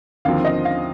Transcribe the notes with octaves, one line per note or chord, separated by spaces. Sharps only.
D#2 D3 F3 C4 F5
D#5
F5